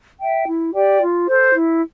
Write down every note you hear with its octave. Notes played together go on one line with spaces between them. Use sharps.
E5 G5
E4
G4 D5 G5
F4
A4 C5
E4